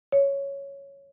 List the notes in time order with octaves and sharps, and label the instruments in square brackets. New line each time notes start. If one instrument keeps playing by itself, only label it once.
[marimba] C#5